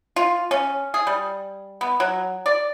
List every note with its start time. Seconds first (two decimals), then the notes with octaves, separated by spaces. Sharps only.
0.16 F4
0.51 C#4
0.94 G#4
1.07 G3
1.81 B3
2.00 F#3
2.46 D5